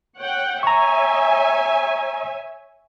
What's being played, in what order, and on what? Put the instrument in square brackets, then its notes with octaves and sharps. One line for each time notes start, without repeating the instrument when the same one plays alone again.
[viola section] C#5 F#5 G5
[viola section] C#5 E5 G#5 [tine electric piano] A#5 C#6